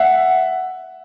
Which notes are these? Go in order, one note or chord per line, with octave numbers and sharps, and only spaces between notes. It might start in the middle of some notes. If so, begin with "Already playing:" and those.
Already playing: E5 F#5